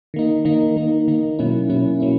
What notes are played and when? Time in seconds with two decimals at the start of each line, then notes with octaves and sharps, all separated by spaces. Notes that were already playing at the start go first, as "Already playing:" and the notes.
0.14 D#3 A#3 D#4
0.45 D#3 A#3 D#4
0.76 D#3 A#3 D#4
1.08 D#3 A#3 D#4
1.39 B2 F#3 A#3 C#4 E4
1.69 B2 F#3 A#3 C#4 E4
2.00 F#3 A#3 C#4 E4